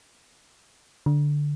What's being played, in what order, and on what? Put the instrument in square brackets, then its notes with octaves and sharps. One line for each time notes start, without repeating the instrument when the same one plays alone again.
[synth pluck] D3